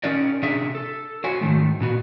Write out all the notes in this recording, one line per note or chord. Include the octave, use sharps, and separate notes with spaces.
C#4 D#4 G4 A#4 C#5 D5
C3 D4 G4 G#4 E5
A4
F#4 C5 C#5 G#5
G#2 D#3 A3
A#2 B3 F#4